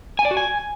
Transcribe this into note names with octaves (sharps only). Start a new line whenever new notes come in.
G#5
D5
F#4
G#5